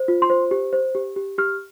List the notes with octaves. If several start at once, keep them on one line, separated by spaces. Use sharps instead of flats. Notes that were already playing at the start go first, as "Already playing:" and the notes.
Already playing: C5
F4
C6
C5
G4
C5
G4
G4
G4 F6